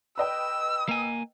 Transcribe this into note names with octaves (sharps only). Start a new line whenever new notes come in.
B4 D#5 G5 E6
A#3 G#5